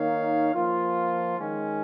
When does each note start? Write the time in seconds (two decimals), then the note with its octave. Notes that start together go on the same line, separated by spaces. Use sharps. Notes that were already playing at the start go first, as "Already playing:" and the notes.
Already playing: D#3 A#3 D#4 C#5 F5
0.54 F3 A#3 F4
1.36 D#3 G#3 C#4